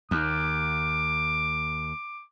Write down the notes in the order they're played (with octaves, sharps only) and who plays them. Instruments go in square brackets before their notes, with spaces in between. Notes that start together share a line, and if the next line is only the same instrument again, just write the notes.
[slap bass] D#2 [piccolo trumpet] D6